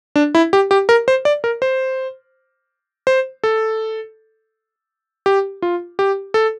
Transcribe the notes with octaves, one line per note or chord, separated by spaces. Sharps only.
D4
E4
G4
G4
A#4
C5
D5
A#4
C5
C5
A4
G4
F4
G4
A4